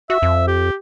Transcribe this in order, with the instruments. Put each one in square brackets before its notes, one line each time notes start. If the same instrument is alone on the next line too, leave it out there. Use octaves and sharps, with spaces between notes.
[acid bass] F#4 [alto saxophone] E5
[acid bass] F2
[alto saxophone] G4